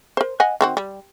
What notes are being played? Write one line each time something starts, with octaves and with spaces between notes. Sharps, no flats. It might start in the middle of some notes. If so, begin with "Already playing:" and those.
A#4 C5
D#5 F#5 G#5
D#3 C4 F#4
G3